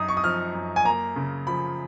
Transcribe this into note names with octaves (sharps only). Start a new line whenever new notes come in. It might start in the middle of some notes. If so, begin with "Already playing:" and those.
Already playing: F#2 D#4 D#6
C#6
D#6
F3 F6
F#2
G#5
A#3 A#5
C#3
F3 B5